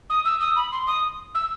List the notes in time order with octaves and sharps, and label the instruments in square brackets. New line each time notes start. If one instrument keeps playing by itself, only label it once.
[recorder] D#6
E6
D#6
B5
C6
D#6
E6